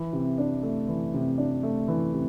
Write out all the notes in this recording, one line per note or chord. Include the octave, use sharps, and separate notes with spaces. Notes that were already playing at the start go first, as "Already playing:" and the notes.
Already playing: E3
C3
D4
A3
E3
C3
D4
A3
E3
C3